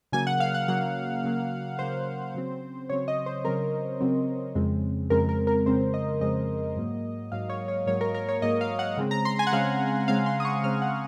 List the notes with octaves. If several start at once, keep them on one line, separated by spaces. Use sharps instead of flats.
C#3 F#3 A#3 G#5
F#5
F5
F#5
C#3 F#3 A#3 F#5
C#3 F#3 A#3
C#3 F#3 A#3 C5
C#3 F#3 C4
C#3 F#3 C4 C#5
D#5
C5
C#3 F#3 C4 A#4
C#3 F#3 C4
F2 C#3 G#3 C4
F2 C#3 G#3 C4 A#4
A#4
A#4
F2 C#3 G#3 C4 C5
D#5
F2 C#3 G#3 C4 D#5
G#2 F#3 A#3
G#2 F#3 A#3 F5
C#5
C#5
G#2 F#3 A#3 C#5
A#4
A#4
C#5
G#2 F#3 A#3 D#5
F5
F#5
C#3 G#3 C4
A#5
C6
G#5
F#5
C#3 G#3 C4 F5
C#3 G#3 C4 F5
C6
D#6
C#6
C#3 G#3 C4 F6
F#5